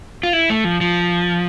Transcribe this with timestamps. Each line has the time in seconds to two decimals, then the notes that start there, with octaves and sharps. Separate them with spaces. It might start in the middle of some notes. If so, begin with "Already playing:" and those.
0.23 F4
0.33 E4
0.50 A3
0.64 F3
0.81 F3